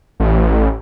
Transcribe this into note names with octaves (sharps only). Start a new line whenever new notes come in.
A1